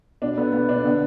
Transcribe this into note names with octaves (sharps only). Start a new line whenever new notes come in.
B2 D4
A3 B3
A3 B3
B2 D4
D3 B3